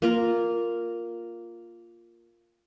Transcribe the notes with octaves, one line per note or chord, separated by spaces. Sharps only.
A#3 F4 A#4